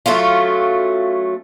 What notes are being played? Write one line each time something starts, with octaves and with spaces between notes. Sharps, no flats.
F#3 A3 C#4 F4